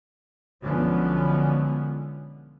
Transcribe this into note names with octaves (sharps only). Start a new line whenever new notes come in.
B1 D3 F3 G#3 B3 C#4